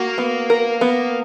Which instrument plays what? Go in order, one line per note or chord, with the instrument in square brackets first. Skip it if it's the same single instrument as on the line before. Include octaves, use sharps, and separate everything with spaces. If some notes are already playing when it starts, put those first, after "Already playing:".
Already playing: [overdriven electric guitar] A#3 [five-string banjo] F#4
[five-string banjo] B3
A#4
B3